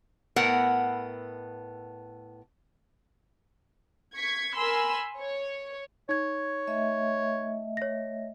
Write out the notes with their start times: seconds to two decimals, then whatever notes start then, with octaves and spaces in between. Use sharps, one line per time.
0.36 A2 B3 A#4 F#5
4.16 C#6 G#6 B6
4.55 A#4 G#5 B5 C6 E6
5.19 C#5
6.09 D#4 C#5 G#6
6.67 A3 D#5 E5
7.77 C#5 A#6